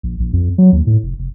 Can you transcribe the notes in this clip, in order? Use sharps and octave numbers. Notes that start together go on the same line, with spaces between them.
A#1
A#1
F2
F#3
D#2
A2
F1
F1